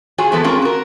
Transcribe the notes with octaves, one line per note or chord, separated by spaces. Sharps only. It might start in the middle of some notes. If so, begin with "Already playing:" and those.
F4 F#4 G#4 C5 G#5
E3 G#3 A3 B3 E4 A4
C4 C#4 F4 G#4 A#4
F#4 A#4